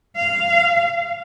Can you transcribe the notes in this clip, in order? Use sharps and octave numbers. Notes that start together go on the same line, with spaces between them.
F5